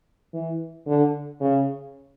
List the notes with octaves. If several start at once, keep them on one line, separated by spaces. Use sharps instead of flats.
E3
D3
C#3